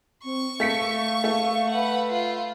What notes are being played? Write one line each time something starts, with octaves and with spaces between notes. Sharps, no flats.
C4 C#6
A3 F5 B6 C#7
A3
B4 F#5
F4